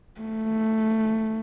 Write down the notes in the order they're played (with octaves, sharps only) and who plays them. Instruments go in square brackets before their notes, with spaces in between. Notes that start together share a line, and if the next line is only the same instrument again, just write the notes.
[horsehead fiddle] A3